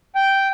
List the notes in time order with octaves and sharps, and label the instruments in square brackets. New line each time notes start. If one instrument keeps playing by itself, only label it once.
[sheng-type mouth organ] G5